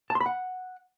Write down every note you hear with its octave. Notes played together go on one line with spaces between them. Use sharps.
A5
C6
B5
F#5